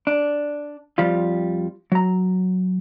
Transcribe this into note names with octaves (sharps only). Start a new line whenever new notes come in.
D4
F2 F3 G3 F4
F#3 A#5